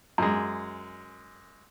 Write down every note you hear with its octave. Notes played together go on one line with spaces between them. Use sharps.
F#2 G#3